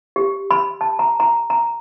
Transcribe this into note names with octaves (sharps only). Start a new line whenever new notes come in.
G4
B5
A5
A#5
A#5
A#5